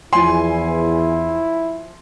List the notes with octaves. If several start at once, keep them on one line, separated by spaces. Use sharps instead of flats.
E2 F3 E4 G#5 C6